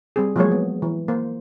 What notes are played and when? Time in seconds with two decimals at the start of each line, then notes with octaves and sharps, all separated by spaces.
0.16 G3 C4 G#4
0.36 F3 F#3 G#3 A#3 G#4 C#5
0.51 B3
0.82 E3
1.08 A#3 C5